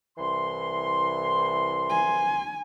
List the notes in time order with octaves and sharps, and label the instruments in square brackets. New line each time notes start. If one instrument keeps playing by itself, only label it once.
[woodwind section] C2 E3 C6
[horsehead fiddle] G#5